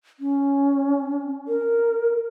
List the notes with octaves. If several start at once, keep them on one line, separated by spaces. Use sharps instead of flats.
C#4
A#4